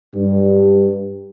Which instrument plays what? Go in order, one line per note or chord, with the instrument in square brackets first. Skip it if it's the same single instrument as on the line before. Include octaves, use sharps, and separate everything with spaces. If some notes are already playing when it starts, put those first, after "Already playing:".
[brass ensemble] G2